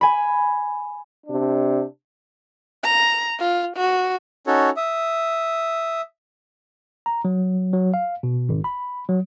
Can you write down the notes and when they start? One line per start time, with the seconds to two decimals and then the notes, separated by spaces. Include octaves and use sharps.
0.01 G#5 B5
1.27 C3 D4
2.83 A#5
3.39 F4
3.76 F#4
4.47 C#4 D#4 F#4 A4 C#5
4.77 E5 D#6
7.06 A#5
7.25 F#3
7.73 F#3
7.94 F5
8.23 B2
8.49 G#1
8.64 B5
9.09 F#3